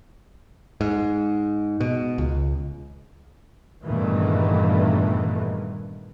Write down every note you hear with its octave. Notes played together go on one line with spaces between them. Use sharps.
G#2
B2
C#2
E2 G2 A#2 D#3 E3 A3